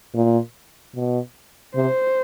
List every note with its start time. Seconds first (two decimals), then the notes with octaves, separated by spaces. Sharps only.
0.14 A#2
0.95 B2
1.75 C3 C5